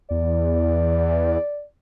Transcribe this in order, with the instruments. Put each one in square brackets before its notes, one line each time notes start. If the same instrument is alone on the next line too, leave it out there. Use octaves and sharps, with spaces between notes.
[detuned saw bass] E2 [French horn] D5